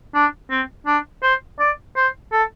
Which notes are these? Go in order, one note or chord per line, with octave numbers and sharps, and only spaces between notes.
D4
C4
D4
C5
D5
C5
A4